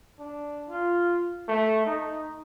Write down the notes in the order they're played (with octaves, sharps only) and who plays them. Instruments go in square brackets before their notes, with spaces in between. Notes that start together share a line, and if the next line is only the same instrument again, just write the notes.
[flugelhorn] D4
F4
A3
D#4